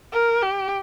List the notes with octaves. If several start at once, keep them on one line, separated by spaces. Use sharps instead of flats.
A#4
G4